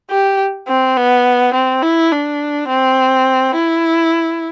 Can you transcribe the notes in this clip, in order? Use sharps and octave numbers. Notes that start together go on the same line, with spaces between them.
G4
C4
B3
C4
E4
D4
C4
E4